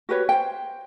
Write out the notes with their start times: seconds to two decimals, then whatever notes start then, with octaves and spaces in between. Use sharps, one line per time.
0.09 F#4 G4 B4 C#5
0.29 C5 G5